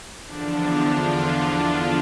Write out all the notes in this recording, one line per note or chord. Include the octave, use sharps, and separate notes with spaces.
E2 D3 F3 D4
F4